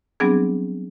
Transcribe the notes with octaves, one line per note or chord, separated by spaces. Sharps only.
F#3 G3 B3 C4 D4 G#4